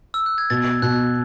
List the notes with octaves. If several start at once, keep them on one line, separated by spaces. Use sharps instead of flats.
E6
F#6
G#6
B2 A6
B2 F#6